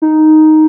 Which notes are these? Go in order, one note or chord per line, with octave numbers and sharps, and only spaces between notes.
D#4